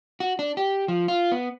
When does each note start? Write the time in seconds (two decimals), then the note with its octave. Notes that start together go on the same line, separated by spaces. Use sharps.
0.20 F#4
0.39 D4
0.57 G4
0.88 F3
1.08 F4
1.32 B3